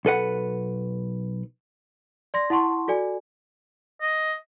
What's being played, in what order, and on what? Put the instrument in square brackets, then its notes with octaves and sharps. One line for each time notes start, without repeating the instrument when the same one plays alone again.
[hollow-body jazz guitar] B1 A4 B4 F#5
[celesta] D5 C6 A#6
E4 F#5 A5 C6 C#6
F#4 A4 D5 G#5
[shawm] D#5